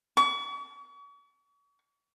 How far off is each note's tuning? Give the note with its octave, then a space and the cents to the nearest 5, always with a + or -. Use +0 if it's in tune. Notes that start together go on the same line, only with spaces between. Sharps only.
C#6 +40